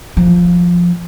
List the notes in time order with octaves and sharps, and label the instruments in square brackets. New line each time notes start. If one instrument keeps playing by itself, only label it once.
[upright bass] F3